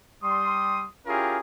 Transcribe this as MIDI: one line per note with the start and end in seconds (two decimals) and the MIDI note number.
0.22 0.86 55
0.22 0.86 84
0.22 0.86 87
1.07 1.38 61
1.07 1.38 64
1.07 1.38 65
1.07 1.38 67
1.07 1.38 68
1.07 1.38 70